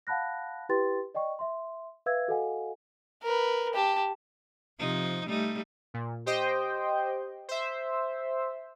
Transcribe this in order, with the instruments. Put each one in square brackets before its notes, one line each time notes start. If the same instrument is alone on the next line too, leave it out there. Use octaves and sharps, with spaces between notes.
[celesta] F5 F#5 A5 B5 F#6 A#6
E4 G4 B4 G5 C6 A6
D5 D#5 G5 C#6
E5 C6
B4 E5 F5 E6 G#6
F#4 A4 D#5 F5 F#5 G#5
[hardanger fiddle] A#4 B4
G4 A5
[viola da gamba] C3 F3 D#4
G3 A3 D#4
[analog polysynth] A#2
G4 C5 D#5 G5
C5 E5